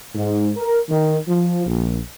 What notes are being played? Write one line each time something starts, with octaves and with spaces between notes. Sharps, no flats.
G#2
A#4
D#3
F3
A#1